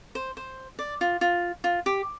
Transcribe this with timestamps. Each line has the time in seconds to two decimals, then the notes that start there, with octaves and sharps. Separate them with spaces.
0.15 C5
0.37 C5
0.79 D5
1.01 F4
1.21 F4
1.64 F4
1.86 G4